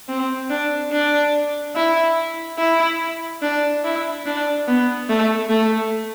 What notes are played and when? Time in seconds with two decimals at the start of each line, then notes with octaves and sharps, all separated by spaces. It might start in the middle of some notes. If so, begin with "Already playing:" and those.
0.09 C4
0.50 D4
0.92 D4
1.75 E4
2.58 E4
3.42 D4
3.84 E4
4.26 D4
4.67 B3
5.09 A3
5.50 A3